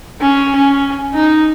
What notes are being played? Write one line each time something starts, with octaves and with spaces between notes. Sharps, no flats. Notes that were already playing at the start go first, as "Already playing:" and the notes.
C#4
C#4
D#4